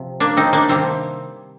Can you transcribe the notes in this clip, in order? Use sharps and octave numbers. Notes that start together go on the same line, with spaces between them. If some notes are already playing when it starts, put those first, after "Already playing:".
Already playing: C3 F3
A#3 D4
C4 D#4
A#3 D4
C3 D#3 G3 C4